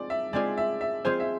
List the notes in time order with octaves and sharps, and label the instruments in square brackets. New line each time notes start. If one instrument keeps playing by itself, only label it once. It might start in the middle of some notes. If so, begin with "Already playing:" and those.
Already playing: [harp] G#3 C4 F4 G#4 [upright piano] D5
[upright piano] E5
[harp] G#3 C4 F4 G#4 [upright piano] D5
[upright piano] E5
E5
[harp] G#3 C4 F4 G#4 [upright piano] C5
[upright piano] E5